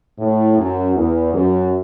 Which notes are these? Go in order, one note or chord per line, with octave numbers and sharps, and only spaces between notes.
A2
F#2
E2
F#2